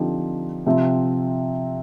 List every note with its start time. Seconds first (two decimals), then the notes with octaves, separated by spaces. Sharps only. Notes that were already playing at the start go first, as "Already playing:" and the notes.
Already playing: D3 F3 C4 D#4 G4
0.66 C3 F3 C4